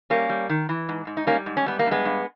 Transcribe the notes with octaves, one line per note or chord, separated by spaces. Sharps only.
G3 A#3 C#4
G3
D#3
E3
G#2
G#2
D#4
G3 A#3 C#4
G#2
C#4
G3 B3
A#3
G2
G#3 B3
G2